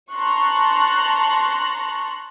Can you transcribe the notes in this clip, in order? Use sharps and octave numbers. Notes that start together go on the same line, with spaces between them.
A5 A#5 C6 C#6 F#6